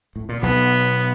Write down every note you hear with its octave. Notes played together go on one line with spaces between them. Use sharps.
A2
A#2
B1 B2 B3